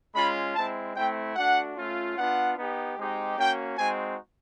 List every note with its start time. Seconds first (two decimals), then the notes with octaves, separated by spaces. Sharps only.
0.15 G#3 C#4 F4 B5
0.55 G#3 C4 E4 A5
0.96 A3 C4 E4 G5
1.36 A3 D4 F#4 F#5
1.77 A3 C#4 F4
2.17 B3 D4 F4 F#5
2.57 B3 D#4 G4
2.98 G#3 C4 D#4 G4
3.37 A#3 C#4 F#4 G5
3.77 G#3 C4 D#4 F#4 G#5